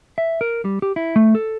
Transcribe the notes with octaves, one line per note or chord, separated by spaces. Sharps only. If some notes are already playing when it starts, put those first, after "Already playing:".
E5
A#4
G3
G4
E4
A3
A4